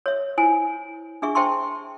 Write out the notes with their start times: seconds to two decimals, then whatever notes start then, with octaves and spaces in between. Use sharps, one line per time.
0.06 C#5 E5
0.38 E4 C5 G#5
1.22 D4 G#4 E5 C#6
1.35 C5 E5 G5 A5 C6 C#6